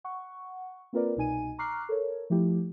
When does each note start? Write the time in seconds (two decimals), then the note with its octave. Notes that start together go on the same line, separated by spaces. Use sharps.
0.04 F#5 C#6
0.93 A#3 C4 F4 A#4 B4 D5
1.16 C2 B2 D#4 G#5 D#7
1.58 A#5 C#6 D6 F6 F#6 C7
1.89 A4 A#4 C#5
2.30 F3 A3 E4 G4